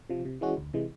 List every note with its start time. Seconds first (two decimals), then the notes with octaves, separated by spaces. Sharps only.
0.10 C3 F3
0.25 C3
0.41 E3 G#3 C#4 F#4
0.57 D2
0.74 C3 E3 G#3